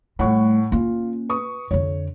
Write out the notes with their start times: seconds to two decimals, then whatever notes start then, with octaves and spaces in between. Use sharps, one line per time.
0.19 A2 G3 A3 F#5 C#6
0.72 A#3 C#4 F4
1.29 B4 C#6 D#6
1.71 F2 D3 C#5